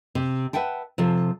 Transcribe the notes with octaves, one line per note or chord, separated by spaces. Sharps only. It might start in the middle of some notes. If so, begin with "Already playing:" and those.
C3
B4 E5 F#5 G5 A5
C3 F3 A4